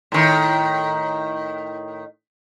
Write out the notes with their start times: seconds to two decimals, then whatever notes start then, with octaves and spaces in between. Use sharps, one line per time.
0.12 A2 D#3